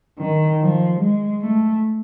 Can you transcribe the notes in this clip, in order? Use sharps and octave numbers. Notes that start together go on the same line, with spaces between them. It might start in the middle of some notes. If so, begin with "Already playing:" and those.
D#3
F3
G#3
A3